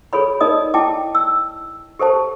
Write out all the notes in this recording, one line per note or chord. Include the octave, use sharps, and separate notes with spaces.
G#4 A4 C#5 B5
D#4 A#4 D5 D#5 D#6
E4 G5 A5 D6
E6
G4 A4 C5 A5